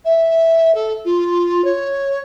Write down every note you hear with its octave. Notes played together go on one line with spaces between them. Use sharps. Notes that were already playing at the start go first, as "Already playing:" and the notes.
E5
A4
F4
C#5